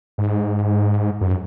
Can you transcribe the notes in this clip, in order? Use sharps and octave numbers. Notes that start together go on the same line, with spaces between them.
G#2
F#2